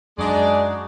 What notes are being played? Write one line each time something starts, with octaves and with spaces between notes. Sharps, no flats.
F#2 G#3 D4 D#4 F#4 G#4 D5